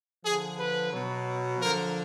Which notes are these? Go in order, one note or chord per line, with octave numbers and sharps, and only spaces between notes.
D3 F3 G#4
B4
B2 F#3
D3 F3 A#4